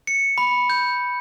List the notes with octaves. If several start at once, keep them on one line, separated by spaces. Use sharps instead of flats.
C#7
B5
G6